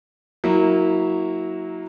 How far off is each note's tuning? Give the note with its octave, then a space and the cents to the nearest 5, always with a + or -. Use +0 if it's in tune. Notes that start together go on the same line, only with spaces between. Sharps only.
F#3 +0 A#3 +0 E4 -25